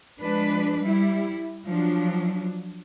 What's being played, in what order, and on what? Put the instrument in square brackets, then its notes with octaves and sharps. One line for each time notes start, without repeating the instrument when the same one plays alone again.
[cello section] F3 G#3 D4 B4
G3 E4
F3 F#3 D4